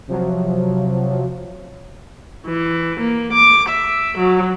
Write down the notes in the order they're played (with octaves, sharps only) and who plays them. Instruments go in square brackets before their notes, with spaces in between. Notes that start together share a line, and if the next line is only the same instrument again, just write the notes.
[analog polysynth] C3 F3 F#3
[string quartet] E3
A#3
D6
E5
F#3